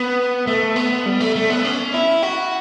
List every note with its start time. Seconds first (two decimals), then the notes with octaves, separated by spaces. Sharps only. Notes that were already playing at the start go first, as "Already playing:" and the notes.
Already playing: B3
0.47 A3
0.76 B3
1.06 G3
1.20 A3
1.35 A3
1.50 B3
1.65 C#4
1.94 E4
2.23 F#4